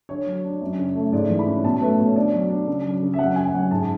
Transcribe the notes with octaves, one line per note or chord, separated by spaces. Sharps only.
D3 C#5
F#3
D4
F#2
C#3
A3
G#2 D5
E3
B5
C#4
B2 A5
A3 B4
B2 C#5
D3 D5
F#3
D4
C#3
F#3
C#3
E5
F#2 F#5
C#3 G#5
F#5
F#2 G#5
G#2 A5